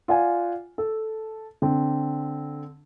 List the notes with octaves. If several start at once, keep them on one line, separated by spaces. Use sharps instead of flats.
F4 D5 F#5 G#5
A4
D3 C4